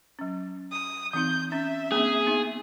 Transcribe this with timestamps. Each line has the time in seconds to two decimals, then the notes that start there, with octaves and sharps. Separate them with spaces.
0.19 F#3 C#4
0.72 D#6
1.13 E3 C4 D#4 G6
1.52 C#4 E5
1.92 A#3 C4 D4 G#4
2.27 B3 D#4